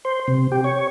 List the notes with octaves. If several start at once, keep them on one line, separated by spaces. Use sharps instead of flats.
C5
C3
G4
C#5